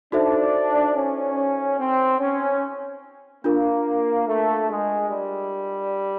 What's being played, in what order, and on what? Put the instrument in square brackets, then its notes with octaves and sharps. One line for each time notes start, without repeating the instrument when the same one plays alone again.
[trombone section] D4 [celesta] D#4 F#4 A4 C5 E5
[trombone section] C#4
C4
C#4
[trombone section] A#3 [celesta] D4 F4 A#4
[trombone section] A3
G#3
G3